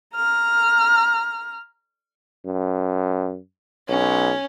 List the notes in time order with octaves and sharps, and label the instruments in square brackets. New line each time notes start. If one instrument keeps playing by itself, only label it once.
[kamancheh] A#5 F6
[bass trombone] F#2
[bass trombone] B1 [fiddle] C#4